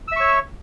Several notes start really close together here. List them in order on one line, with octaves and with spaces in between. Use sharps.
E6 E5 C#6 C#5